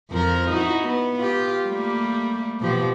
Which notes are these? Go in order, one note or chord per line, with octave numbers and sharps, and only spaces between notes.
F2 F3 A#4
D#4 E4 F#4
B3
F4 G4
G3 A3 A#3
B2 F3 G4